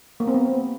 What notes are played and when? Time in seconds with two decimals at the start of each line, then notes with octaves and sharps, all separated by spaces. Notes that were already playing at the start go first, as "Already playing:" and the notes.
0.20 A#3
0.27 C4
0.34 B3